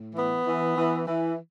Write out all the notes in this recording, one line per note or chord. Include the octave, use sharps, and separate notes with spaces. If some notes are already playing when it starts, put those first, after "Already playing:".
Already playing: A2
E3 B3
E3
E3
E3